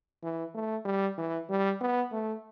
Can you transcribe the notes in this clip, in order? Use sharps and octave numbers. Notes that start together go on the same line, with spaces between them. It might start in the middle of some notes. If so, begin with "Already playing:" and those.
E3
A3
G3
E3
G3
B3
A3